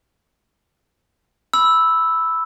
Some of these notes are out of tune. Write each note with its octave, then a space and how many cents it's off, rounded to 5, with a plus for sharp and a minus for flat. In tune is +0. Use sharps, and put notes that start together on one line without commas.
B5 +5 E6 -5